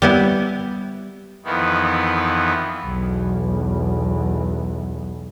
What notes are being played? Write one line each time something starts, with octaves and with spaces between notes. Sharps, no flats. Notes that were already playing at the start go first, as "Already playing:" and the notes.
G3 B3 E4
F2 D#3 E3 B3
B1 E2